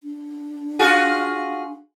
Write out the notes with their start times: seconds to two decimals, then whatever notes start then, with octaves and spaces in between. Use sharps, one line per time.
0.03 D4
0.79 F4 F#4 G#4